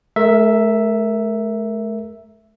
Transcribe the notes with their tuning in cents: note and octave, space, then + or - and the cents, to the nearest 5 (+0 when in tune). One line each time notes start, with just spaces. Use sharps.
A3 -40 A#4 +0 E5 +0